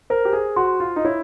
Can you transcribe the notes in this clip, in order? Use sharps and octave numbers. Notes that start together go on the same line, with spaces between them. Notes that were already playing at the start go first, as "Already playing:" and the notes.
A#4 C5
G4
G#4
F#4 C6
F4
D#4
E4 C#5